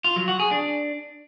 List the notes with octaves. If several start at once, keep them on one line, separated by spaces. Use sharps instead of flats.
F4
F#3
F#4
G#4
D4